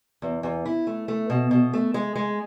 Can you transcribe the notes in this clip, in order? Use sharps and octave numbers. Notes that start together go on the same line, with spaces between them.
E2
E2
E4
A3
A3
B2
B2
A3
G#3
G#3